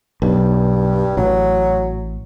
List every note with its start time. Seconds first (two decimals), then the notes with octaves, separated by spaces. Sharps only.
0.22 B1 G2
1.17 A1 F#3